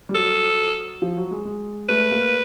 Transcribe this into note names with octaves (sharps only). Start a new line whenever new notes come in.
G3
F#3 A4
F3
F#3
G#3
G#3
A3 B4
A#3